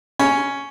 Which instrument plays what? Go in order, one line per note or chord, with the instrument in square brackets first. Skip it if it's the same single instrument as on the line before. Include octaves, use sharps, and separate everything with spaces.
[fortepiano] C#4